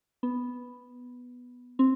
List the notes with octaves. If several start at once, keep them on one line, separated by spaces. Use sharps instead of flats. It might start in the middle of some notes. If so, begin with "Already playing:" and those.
B3
C4